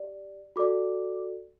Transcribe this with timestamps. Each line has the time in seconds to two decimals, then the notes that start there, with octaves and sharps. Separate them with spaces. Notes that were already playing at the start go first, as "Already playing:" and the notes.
Already playing: G4 D5
0.56 F#4 A4 D5 D6